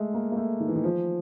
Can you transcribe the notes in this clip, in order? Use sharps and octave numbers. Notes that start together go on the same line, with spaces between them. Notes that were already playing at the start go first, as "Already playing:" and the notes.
Already playing: G#3 A3
A#3
A#3
A3
D#3
E3
D#3
F3